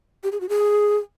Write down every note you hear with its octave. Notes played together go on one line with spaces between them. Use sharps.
G4
G#4
F#4
G#4